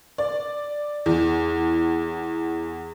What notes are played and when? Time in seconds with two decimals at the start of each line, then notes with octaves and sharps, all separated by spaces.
0.18 D5
1.06 E2